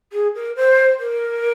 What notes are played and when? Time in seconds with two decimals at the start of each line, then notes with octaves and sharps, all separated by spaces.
0.12 G#4
0.35 A#4
0.56 C5
1.00 A#4